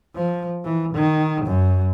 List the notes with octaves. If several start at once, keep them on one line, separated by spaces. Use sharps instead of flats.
F3
E3
D#3
F#2